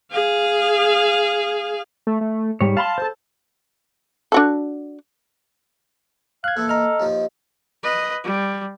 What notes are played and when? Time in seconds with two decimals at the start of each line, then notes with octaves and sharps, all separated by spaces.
0.12 G#4 F5
2.07 A3
2.21 A3
2.61 G#2 G3 C#5
2.77 F5 A5 B5 C6
2.98 A4 C5
4.32 D4 F#4 A4
6.44 F5 F#6 G#6
6.57 A#2 E3 A4
6.69 D#5 A#5 F6
7.00 D#2 F3
7.83 B4 D#5
8.24 G3